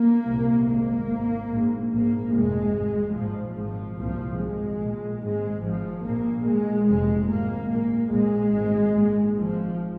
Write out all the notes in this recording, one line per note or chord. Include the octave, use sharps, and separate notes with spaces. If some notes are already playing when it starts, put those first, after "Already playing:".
Already playing: A#3
C2 A#2
G#1 G#2 A#3
G#1 G#2
A#1 G#2
A#1 G#2 A#3
F1 F2 C3 G#3
G#1 G#2
A#1 G#2 F3
G#1 G#2 F3
C2 A#2 F3
G#1 G#2 G#3
A#1 A#2
G#1 G#2 G#3
G#1 G#2 F3
A#1 A#2 A#3
A#1 A#2 G#3
F1 F2 C3 G#3
G#1 G#2 A#3
A#1 A#2 A#3
A#1 A#2 G#3
G#1 G#2
A#1 A#2
G#1 G#2 F3